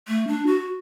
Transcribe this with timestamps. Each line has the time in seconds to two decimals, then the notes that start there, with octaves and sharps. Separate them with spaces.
0.08 A3
0.28 D4
0.46 F#4